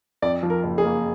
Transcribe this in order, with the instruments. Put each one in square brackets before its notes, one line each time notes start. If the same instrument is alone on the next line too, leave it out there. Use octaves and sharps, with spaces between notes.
[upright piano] F2 [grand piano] D5
[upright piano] F3
[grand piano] A#4
[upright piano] F#1
[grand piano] G#4
[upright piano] A#3